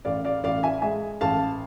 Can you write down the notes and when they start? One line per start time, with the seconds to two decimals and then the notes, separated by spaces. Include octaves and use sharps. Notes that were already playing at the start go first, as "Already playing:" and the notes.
0.05 A1 D5 F5
0.25 D5 F5
0.44 A1 D5 F5
0.63 E5 G#5
0.82 G#3 E5 G#5
1.21 A1 F5 A5